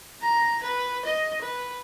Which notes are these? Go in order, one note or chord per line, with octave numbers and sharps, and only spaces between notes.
A#5
B4
D#5
B4